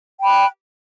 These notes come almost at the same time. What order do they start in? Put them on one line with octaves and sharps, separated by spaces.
G5 B5 F#6